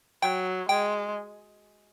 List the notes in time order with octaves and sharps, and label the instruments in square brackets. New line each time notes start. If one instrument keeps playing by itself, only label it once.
[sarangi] F#3 [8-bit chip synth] G5
[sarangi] G#3 [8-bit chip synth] G5